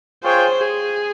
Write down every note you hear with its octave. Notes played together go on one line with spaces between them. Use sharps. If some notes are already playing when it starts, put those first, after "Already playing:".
F4 G#4 C5 C#5 G5
G#4